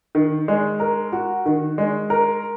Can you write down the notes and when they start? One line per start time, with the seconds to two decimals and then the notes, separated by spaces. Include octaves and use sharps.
0.15 D#3
0.48 G#3
0.80 A#4
1.12 F#4
1.46 D#3
1.78 G#3
2.10 A#4